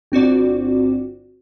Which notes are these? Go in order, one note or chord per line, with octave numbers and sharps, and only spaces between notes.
G1 C4 F#4 D5